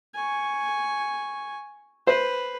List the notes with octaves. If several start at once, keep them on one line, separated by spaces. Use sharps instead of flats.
G#5 C#6
B4 C5